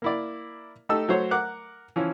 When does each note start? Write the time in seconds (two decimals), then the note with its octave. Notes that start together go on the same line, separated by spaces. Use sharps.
0.02 A#3 E4 D5
0.89 A3 D#4 G4 A4 E6
1.09 F#3 A3 C5 C#5
1.31 A#4 F#5 D6 F#6
1.96 E3 F3 C#4